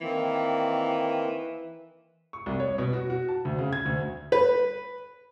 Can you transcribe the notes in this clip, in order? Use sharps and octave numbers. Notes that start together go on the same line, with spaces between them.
D#3 E3 A#3 C4
C#6
C2
C#5
B2
F#4
F#4
A5
D2
C#3
G#6
D2
B4